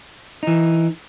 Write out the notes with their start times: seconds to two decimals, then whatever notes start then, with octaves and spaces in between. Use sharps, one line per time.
0.43 E3 D#4